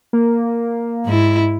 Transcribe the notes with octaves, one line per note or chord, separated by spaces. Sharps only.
A#3
G#2 E4